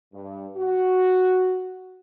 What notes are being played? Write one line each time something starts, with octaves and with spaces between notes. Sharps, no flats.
G2
F#4